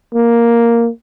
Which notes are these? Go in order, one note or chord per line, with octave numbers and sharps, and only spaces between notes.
A#3